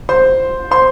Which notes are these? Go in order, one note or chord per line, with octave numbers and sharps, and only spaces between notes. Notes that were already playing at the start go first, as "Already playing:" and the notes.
C5 C6
C5 C6